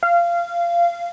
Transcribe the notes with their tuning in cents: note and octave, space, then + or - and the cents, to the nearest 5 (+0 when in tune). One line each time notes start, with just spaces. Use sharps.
F5 -20